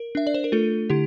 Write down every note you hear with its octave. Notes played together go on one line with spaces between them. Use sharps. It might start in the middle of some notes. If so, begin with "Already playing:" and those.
Already playing: A#4
D4 E5
D5
C5
A#4
A3 F4 A4
D3 E4 G4